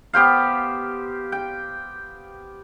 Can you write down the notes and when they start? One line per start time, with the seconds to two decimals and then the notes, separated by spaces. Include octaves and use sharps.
0.13 B3 G4 C5 F5
1.32 G5